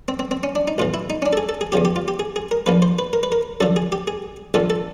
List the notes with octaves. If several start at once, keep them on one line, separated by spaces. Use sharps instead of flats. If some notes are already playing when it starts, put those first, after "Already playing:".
C4
C4
C4
C#4
D4
D#4
B1 A2 E3 F4
E4
D#4
C#4
D4
A4
G#4
A4
G#4
E2 C#3 F3 G4
G4
F4
G4
G#4
G#4
A#4
A#1 A#2 F3 B4
C5
B4
A#4
B4
A#4
F#2 D3 F3 A4
G#4
G4
G#4
A#1 A#2 F3 A4
A4